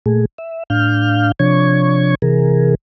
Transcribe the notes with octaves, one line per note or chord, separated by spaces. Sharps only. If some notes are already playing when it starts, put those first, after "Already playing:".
A#2 A3 G#4
E5
A2 D4 F5 F6 G6
C3 F3 D4 C#5 C#6 G#6
C3 E3 G#4 A#4